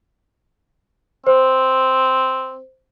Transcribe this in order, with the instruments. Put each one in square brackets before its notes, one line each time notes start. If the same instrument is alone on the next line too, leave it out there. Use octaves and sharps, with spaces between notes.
[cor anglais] C4 [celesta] C5